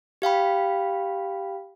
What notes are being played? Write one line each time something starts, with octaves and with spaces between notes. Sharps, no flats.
G4 F5 G5 B5